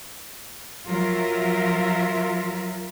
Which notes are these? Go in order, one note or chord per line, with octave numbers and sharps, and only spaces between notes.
F3 F#3 F4 A#4 E5